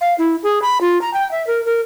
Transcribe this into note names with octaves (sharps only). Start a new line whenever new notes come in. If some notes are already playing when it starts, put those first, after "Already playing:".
F5
E4
G#4
B5
F4
A#5
G5
E5
A#4
A#4